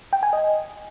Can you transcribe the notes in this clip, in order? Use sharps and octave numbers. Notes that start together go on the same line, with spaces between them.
G5
G#5
D#5